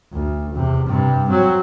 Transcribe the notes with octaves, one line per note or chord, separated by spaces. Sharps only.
D2
E2 C3
G2 C3
F#3 C4